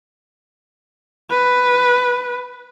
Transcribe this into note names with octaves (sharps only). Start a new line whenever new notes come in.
B4